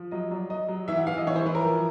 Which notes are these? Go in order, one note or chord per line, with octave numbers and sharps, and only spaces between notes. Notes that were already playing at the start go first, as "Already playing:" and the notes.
Already playing: F3
F#3 D#5
F#3 D5
F#3 D#5
F#3
E3 E5
F#5
E3 F5
D#5
E3 C#5
C5
E3 B4
A#4
F3